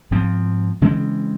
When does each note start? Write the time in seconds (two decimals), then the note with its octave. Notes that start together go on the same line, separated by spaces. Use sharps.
0.11 G#2 F3 C4
0.81 C#3 E3 G#3 C4